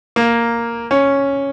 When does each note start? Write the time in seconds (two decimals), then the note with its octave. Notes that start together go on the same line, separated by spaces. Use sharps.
0.16 A#3
0.91 C#4